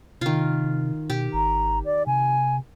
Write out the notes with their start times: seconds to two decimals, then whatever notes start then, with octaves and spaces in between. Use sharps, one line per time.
0.21 C3 D#3 F4
1.10 B2 G4
1.34 G#1 A#5
1.85 D5
2.07 C3 G#5